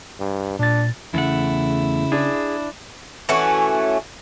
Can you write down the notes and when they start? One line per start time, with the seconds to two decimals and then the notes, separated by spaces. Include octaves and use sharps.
0.20 G2
0.59 A#2 D4 A6
1.14 E2 C#3 A3 E4 F#5
2.12 D4 G#4
3.29 E3 A3 C#4 F#4